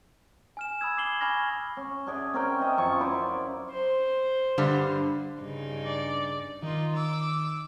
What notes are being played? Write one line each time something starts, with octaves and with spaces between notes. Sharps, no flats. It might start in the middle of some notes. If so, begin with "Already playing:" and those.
G#5 F6 E7
B5 D#6 E6 G#6
B5 D6 D#6 C7 F#7 G7
G#5 B5 C#6 F6 G#6 A#6
C#4
D4 G#4 D5 E5
C4 C#4 A#4 G5
D#5 E5
F#2 F3 C#6
E4 C5 D5 D6
C5
G2 D3 G3
G2 C#3 D#4
D5
D#3 D#4 F4
D6 E6